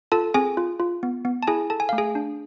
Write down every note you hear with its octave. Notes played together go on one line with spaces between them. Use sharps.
F4 A4 A5
C4 G#4 G#5
F4
F4
B3
B3
A5
E4 G#4 G#5
A4 A5
G#5
A3 F5
G#4 G#5
D4